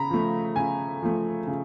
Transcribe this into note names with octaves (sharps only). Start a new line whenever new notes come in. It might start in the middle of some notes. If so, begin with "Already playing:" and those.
Already playing: C#3 A#5 B5
F3 A3
C#3 G#5
F3 A3
C#3